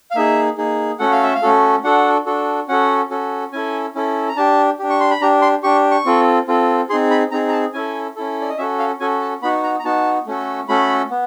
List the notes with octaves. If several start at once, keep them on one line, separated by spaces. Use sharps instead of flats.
F5
A#3 D#4 G#4 E5
A#3 D#4 G#4
A3 C#4 F#4 A4 F#5
F5
E5
F5
A3 C#4 F#4 A4
D4 F#4 A4 F#5
D4 F#4 A4
C#4 F#4 A4 F#5
C#4 F#4 A4
C#4 E4 A4 G#5
C#4 E4 A4
A#5
D4 G4 A5
D4 G4
C#6
C6
B5
D4 G4 A#5
C6
D4 G4 C#6
C#6
C4 F4 A4
C4 F4 A4
C4 D#4 G#4 C6
B5
C4 D#4 G#4 A#5
A#5
A5
C#4 E4 A4 G#5
C#4 E4 A4
D5
D#5
C#4 F#4 A4 E5
F5
C#4 F#4 A4 G#5
A5
B3 D#4 F#4 B5
A#5
A#5
B3 D#4 F#4 A5
A3 C#4 F#4 A4
A3 C#4 F#4 A4 B5
B3